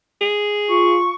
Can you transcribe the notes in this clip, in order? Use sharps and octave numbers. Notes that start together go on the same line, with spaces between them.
G#4
F4 C#6